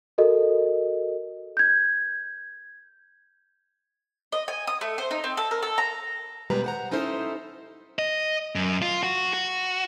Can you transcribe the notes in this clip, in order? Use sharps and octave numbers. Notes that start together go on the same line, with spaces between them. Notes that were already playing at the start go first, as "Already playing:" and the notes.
F#4 A4 A#4 D#5
G6 G#6
D#5
G#5
D#6
A3
C5
D#4
C4
A4
A#4
A4
A#5
D#2 B2 G3 G#3 B4 A#5
C5 F#5 A#5
C#4 D#4 E4 A4 C5
D#5
F#2
F4
F#4
F#4